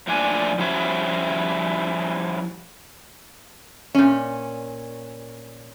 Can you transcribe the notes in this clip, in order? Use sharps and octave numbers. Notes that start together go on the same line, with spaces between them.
A2 F3 A#3 D4 G#5
F3 G3 C#4 E4 F#4
A#2 C#4